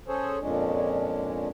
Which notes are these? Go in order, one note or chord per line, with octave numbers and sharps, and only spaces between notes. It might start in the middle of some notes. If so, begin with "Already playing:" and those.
C#4 G#4 A4 C5 C#5
F2 A#2 G#3 C#4 D4